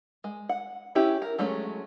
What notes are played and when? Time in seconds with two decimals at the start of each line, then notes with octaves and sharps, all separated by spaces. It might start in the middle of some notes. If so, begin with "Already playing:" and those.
0.24 G#3
0.49 F#5
0.95 C#4 E4 G4
1.22 A#4
1.39 F#3 G#3 A3 C#4